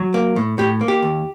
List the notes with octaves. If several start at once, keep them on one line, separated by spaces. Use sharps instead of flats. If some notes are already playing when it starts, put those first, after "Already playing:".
Already playing: F#3
A#3
A2
A2 G4
A#3
G4
D#2